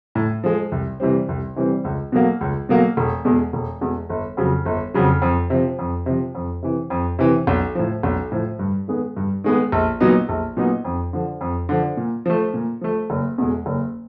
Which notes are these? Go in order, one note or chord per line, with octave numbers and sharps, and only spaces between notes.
A2
F3 G#3
C2
C3 E3 G3 C4
C2
C3 E3 G3 C4
C#2
B2 F#3 A#3
C#2
B2 F#3 A#3
E1
E2 B2 G#3
E1
E2 B2 G#3
G1
F2 C#3 F#3
G1
F2 C#3 F#3
F2
C3 F3
F2
C3 F3
F2
C3 E3
F2
C3 E3
B1
A2 F3
B1
A2 F3
G2
D#3 G#3 B3
G2
D#3 G#3 B3
A#1
A#2 F#3 B3 D#4
A#1
A#2 F#3 B3 D#4
F2
D3 F3
F2
D3 F3
A#2
F3 A3
A#2
F3 A3
F#1
E2 B2 G#3
F#1